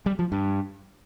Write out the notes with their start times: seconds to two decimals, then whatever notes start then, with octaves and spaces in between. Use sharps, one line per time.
0.06 G3
0.19 F3
0.32 G2